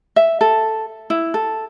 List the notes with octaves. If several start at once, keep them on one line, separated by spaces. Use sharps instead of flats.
E5
A4
E4
A4